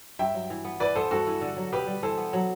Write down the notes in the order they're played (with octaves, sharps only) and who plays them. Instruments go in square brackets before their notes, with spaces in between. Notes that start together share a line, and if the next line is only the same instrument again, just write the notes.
[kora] G2 [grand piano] E5 G5
[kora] F#3
E3
B3
[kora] E3 [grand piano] B4 D5
[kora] B3 [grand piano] A4 C5
[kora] G2 [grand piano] F#4 A4
[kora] E3
D3
F#3
[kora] B2 [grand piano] G4 B4
[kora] G3
[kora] E3 [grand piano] A4 C5
[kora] B3
F#3